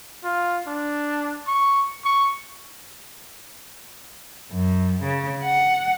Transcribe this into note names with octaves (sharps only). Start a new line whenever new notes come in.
F4
D4
C#6
C#6
F#2
C#3
F#5